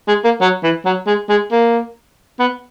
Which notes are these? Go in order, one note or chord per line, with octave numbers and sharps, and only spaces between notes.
G#3
A#3
F#3
E3
F#3
G#3
G#3
A#3
B3